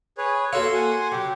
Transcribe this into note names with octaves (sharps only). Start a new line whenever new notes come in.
G#4 B4 C#5
A#3 F#4 A4 C#5 F5 C6 E6
F#5 G#5
C#3 F#3 G4